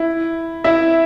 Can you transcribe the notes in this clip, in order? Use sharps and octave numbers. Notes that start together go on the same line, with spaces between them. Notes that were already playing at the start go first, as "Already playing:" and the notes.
Already playing: E4
E4 E5